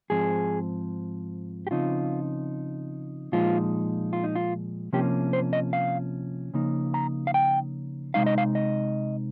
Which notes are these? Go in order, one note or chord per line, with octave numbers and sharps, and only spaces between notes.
G#2 F3 C4 G#4
G4
C#3 F3 C4 D#4 F4
A#2 F3 G#3 D#4 F4
F4
D#4
F4
C3 F3 A#3 C#4 G4
C5
D#5
F5
C#3 F3 A#3 D#4
A#5
F5
G5
C3 D#3 G#3 D#4 F5
D#5
F5
D#5